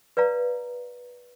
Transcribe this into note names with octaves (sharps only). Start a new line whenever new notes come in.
B4 D5 F5 A#5